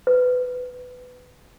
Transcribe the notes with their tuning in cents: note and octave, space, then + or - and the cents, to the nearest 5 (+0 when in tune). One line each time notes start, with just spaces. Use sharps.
B4 +15